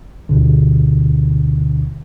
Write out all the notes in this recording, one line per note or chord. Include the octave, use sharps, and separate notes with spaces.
D2 B2 D3